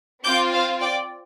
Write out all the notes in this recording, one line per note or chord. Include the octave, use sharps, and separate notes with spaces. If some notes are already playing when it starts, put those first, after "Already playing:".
C4 F4 D6 G6
C5 F5
D5 G5